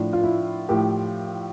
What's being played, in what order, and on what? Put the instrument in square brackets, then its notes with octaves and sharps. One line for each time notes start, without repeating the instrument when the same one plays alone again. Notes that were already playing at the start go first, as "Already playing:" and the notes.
Already playing: [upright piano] A2 F3 D4
F4
E4
A2 F3 G4